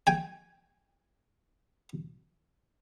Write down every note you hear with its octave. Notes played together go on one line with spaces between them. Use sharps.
G5 G#5